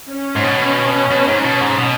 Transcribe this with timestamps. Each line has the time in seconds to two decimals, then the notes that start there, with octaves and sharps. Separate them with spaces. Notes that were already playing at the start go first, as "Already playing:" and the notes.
0.10 C#4
0.36 G#2
0.44 B2
1.11 B2
1.27 G#2
1.44 B2
1.61 G#2
1.78 B2